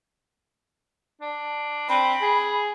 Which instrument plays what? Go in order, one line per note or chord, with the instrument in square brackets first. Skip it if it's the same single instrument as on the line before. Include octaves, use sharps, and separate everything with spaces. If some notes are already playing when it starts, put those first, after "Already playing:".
[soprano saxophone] D4
[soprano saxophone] C4 [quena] B5
[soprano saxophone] G#4